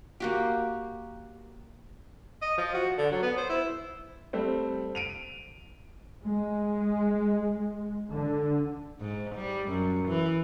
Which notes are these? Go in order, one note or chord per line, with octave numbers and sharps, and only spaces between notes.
A#3 F#4 G4
D#5
F3
F#4
D3
F#3
B3
C5
E4
G3 A3 C4
D7 D#7 F7
G#3
D3
G#2
G3
F#2
E3